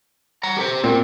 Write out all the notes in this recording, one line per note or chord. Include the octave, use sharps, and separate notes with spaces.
F#5 A#5
G4 A4 C5
A#2 C4